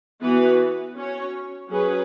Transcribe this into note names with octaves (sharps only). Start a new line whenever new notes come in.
E3 B3 F#4 B4
C#4 F#4 C#5
F#3 C#4 G#4 B4